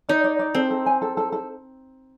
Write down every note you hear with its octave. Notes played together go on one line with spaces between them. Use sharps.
D#4 D5
D5
D5
C4 A4
A4
G#5
A4
A4
A4